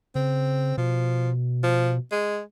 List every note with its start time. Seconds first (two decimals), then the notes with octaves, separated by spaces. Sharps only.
0.15 C#3 C4
0.78 B2 F3
1.63 F3
2.11 G#3